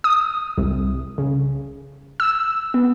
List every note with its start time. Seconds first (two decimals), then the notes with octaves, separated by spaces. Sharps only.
0.04 D#6
0.58 C2
1.18 C#3
2.20 E6
2.74 B3